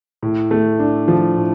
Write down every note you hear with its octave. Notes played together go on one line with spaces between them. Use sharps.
A2
A3
D4
F3
A2